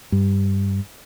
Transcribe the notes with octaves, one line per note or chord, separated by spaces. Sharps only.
G2